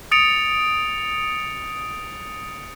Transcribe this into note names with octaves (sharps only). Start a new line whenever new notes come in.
D#6 A6 C#7 D7 F7